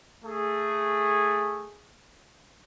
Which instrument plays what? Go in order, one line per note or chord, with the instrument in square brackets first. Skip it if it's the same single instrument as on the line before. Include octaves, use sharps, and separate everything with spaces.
[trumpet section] A3 G#4